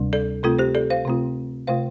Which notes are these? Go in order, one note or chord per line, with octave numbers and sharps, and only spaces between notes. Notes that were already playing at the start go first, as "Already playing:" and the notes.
Already playing: D2 C3 G3 D4
A4 D5
C3 A3 C4 F4 A4
G4 C5
A4 D5
C5 F5
C3 A3 C4 F4
C3 A3 F4 C5 F5